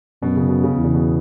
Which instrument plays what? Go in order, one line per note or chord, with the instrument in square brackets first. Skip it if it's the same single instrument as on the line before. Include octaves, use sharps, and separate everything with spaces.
[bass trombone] F#2 [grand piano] B2
[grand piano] C#3
B2
C#3
[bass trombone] E2
[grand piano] C#3
B2